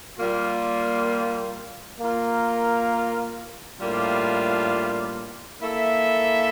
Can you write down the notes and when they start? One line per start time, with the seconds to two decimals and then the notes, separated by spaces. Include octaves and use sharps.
0.18 A#2 G3 A#3 F4
2.00 A#3 F4 A#4
3.80 A2 G3 A#3 D4 F4
5.62 A#3 E4 A4 E5